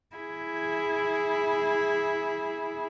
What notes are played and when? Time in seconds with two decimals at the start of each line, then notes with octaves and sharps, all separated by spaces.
0.16 E4 G#4